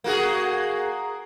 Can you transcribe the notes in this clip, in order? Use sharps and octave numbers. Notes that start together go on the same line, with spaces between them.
A#3 F#4 G#4